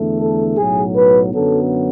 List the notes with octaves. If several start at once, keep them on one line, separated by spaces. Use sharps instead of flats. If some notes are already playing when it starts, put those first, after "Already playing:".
Already playing: E2 D3 A3
A4
B1 A2 F#3 G#4
B4
F#2 D3 F#3 B3 A4